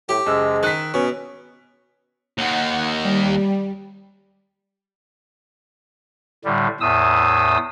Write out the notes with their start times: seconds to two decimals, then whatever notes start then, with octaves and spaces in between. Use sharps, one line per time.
0.09 A2 G4
0.26 F#1 G#3 E6
0.63 D#3 F#6 B6
0.94 B2 C#4
2.38 D#2 D#3 F#5
3.04 G3
6.45 A2 D3 G3
6.80 E2 A2 D#6 E6